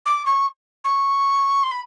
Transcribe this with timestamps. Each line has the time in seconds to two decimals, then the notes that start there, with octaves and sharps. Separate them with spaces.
0.05 D6
0.25 C#6
0.84 C#6
1.63 C6
1.71 B5